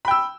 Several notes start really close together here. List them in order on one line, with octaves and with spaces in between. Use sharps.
B5 G5 E6